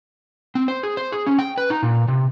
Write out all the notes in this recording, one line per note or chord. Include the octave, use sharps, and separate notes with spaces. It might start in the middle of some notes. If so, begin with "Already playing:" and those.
C4
C5
G#4
C5
G#4
C#4
G5
B4
D#4
A#2
C3